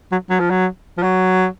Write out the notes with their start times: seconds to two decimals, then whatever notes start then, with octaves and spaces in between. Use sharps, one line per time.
0.12 F#3
0.30 F#3
0.40 F3
0.51 F#3
0.98 F3
1.03 F#3